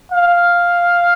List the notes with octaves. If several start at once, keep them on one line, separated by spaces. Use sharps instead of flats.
F5